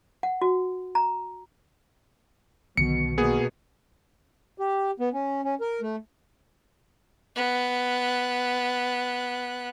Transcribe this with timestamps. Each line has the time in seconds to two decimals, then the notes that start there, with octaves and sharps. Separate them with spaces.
0.23 F#5
0.41 F#4
0.95 A#5
2.77 B1 B2 D3 D#3 C#7
3.18 B2 A#3 B3 G#4
4.58 G4
5.00 B3
5.13 C#4
5.44 C#4
5.61 A#4
5.81 A3
7.36 B3 F#6